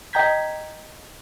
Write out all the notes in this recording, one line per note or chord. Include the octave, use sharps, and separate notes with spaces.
D#5 G5 A#5 G6 G#6 B6